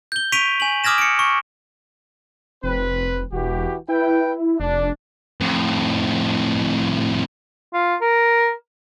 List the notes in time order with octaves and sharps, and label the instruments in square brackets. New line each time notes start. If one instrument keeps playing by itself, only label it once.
[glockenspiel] G6 G7
C#6 B6 D7 D#7 F7
G#5 F#7
D6 D#6 F6 G#6 A#6 E7
C#7 D7
C#6
[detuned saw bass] F1 [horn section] C4 B4
[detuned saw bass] E1 [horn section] E3 F#4 G4
[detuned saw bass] E4 [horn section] B4 G5
[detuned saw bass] F1 [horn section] D4
[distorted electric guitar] F2 A2
[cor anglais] F4
A#4